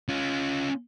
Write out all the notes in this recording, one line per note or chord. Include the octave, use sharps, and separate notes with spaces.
C#4 F4